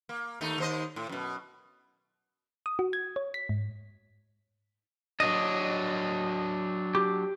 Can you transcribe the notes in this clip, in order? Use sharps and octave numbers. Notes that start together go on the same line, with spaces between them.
A#3
D#2 A3 D#4
D#2 C5 D#5
A2
F#2 B2
D#6
F#4
G#6
C#5
B6
G#2
F#3 D4 D#5
G4